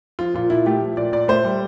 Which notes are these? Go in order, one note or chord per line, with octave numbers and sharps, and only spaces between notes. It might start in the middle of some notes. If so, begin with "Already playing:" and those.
F3 F4
A#2 F4
A#2 E4
A3 G4
F3
A#2 D5
A#2 D5
A3 C5
G3